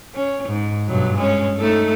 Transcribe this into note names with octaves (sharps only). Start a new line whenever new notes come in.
C#4
G#2
G2 B2 F#3
G#3 C#4
A3 D#4 A4